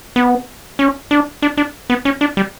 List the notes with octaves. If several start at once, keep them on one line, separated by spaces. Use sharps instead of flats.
B3
C#4
D4
D4
D4
B3
C#4
D4
G3